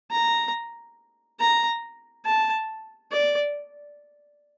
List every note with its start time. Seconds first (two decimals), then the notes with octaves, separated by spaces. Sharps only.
0.11 A#5
1.40 A#5
2.26 A5
3.12 D5